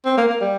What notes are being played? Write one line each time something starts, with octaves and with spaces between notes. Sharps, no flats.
C4
A#3
A#3
G3